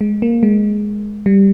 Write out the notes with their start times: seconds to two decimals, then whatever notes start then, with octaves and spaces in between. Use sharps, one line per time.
0.01 G#3
0.22 A#3
0.43 G#3
1.26 G3